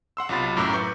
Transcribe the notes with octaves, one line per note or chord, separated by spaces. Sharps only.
F#5 C6 E6
B1 C3 F4 B5 A6
F#2 A2 A#5 D6 E6 F#6
B4 C#6 G6